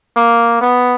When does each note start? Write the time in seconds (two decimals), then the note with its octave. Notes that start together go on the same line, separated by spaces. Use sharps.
0.16 A#3
0.61 B3